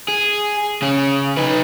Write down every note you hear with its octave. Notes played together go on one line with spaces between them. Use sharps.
G#4
C#3 G#4
D#4 B4